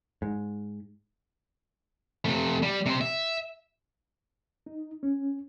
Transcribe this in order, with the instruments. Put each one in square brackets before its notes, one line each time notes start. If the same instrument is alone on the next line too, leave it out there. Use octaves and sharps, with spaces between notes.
[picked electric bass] G#2
[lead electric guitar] C3 A3
G3
C3 C5
E5
[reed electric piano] D#4
C#4